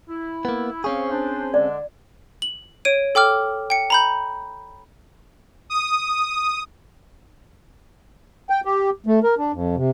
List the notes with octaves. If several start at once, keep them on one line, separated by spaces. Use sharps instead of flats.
E4
A#3 B3
C4 C#4 G#4 C5 F5 C#6
D4 C5
D3 G#3 D4 D5
F#7
C#5 D7 D#7
A4 G5 D6 F6
G5 C#7
A#5 B5 G6
D#6
G5
G4
A3
A#4
D4
F2
C3